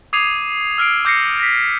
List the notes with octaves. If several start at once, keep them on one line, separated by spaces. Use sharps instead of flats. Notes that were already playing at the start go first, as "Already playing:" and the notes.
D6 D#6 G#6 C7 D#7 F7
E6 F6 C7 D7
D6 G6 A#6 C7 C#7
A#6 B6